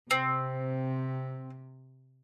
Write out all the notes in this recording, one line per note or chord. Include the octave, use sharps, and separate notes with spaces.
C3 C4